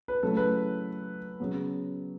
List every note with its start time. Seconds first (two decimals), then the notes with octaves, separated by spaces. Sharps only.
0.08 B4
0.23 C#3 F#3 A3 E4 A4
0.37 B4
1.40 C#3 F#3 B3